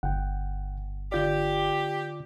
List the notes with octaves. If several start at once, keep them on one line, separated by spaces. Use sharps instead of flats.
G1 F#5 G5
D3 F4 G4 D5